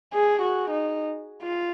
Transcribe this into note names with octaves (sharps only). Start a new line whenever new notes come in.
G#4
F#4
D#4
F4